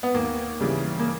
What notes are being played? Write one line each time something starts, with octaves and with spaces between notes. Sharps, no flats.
B3
D#2 A#3
C#3 E3 G3
A#3